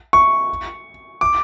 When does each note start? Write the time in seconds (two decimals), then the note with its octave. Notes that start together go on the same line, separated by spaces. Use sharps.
0.13 C#6
1.21 D6